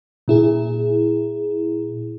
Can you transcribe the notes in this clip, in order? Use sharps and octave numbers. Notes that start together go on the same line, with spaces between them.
A#2 E4 G#4